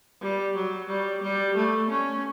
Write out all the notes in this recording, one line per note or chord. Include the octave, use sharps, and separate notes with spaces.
G3
F#3
G3
G3
A3
C#4